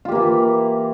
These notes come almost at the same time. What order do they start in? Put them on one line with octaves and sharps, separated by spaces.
F4 G4 A#3 E3